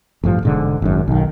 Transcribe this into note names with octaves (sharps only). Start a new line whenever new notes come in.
A1 G2 F3
E1 G#2 D3
G#1 F#2
B1 D#3